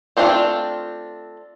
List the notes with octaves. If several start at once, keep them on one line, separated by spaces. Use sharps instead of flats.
A3 C4 D4 F4